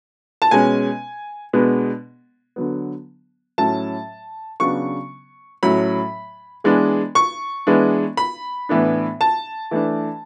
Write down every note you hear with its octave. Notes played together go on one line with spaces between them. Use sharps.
A5
B2 G#3 C#4 G#5
B2 G#3 B3 D4
D3 F#3 B3
A2 F#3 C#4 A5
C#3 F#3 B3 D4 C#6
A2 F#3 C#4 B5
E3 G#3 B3 D4
C#6
E3 G#3 B3 D4
B5
A2 E3 B3 D4
A5
E3 A3 D4